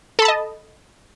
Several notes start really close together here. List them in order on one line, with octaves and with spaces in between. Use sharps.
A4 B5 A5 D#5